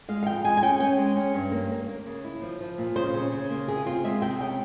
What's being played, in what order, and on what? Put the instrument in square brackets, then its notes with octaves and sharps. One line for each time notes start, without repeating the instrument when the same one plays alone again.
[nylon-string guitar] G#3 F5
F5
F2 G5
G#3 G#5
G#5
C#4 G5
C#4 G5
G#3
C#4
G2
A#3
A#3
A#3
C#3
E4
F3
F3
A#2
C#3 C5
C#3
C#3
A#3
C3 G#4
C4 F4
G#3 E5
C3 G5
C#3 G5